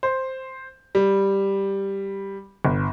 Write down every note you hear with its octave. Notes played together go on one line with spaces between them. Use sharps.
C5
G3
G1